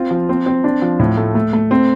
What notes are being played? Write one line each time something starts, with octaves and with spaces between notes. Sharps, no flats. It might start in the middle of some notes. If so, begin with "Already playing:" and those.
Already playing: C4 F4
F3
C4
C4
D4
F3
A2
A3
A3
A3
C4